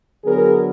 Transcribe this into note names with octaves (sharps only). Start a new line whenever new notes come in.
D3 F#3 B3 G#4 A#4